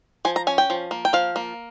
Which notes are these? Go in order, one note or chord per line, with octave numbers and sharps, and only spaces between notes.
F3 G#5
A#5
C#4 G#5
G5
F3
A#3
G5
F3 F5
A#3